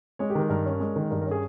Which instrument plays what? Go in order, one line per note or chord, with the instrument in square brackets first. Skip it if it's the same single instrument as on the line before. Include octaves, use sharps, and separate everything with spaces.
[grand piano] G#3 C#5
G4
D#3 A#4
G2 A#4
C#4
G#3
D#3
G2 A#4
C#4 A#4
G#4